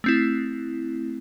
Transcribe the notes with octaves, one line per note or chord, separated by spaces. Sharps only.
A3 C4 E4